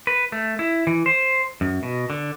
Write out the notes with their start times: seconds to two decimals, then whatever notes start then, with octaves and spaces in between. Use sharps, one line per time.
0.07 B4
0.32 A3
0.59 E4
0.87 E3
1.06 C5
1.61 F#2
1.83 B2
2.10 D3